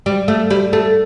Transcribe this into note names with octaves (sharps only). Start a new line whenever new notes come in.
G3
A3
G3
A3